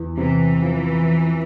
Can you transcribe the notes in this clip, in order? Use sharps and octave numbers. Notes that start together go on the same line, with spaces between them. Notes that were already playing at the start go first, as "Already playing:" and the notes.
Already playing: E2
C3 E3
F3